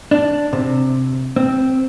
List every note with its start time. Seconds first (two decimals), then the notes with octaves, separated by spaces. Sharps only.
0.11 D4
0.53 C3
1.36 C4